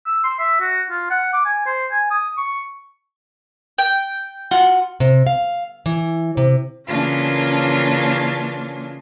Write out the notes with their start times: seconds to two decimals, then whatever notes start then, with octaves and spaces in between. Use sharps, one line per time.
0.06 E6
0.24 C6
0.39 E5
0.60 F#4
0.90 F4
1.10 F#5
1.33 D6
1.45 G#5
1.66 C5
1.91 G#5
2.11 D#6
2.38 C#6
3.78 G5
4.51 F4 F#4 F#5
5.00 C3
5.27 F5
5.86 E3
6.37 C3
6.88 C#3 E3 A#3 C#4 D4 F4